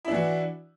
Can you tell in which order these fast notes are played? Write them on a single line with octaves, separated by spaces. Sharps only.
E4 D4 E3 F#4